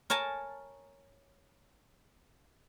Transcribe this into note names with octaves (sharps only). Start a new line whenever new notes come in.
A#4 C#5 G#5 A5